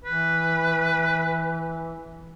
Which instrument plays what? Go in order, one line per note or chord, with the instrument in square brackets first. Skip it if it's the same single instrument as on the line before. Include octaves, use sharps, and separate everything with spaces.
[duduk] E3 [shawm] B4